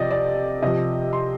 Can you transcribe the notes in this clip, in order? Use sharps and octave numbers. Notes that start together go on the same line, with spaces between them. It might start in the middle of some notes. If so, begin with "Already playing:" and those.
Already playing: C3 F3 D5 D#5
D5
C3 F3 D#5
C6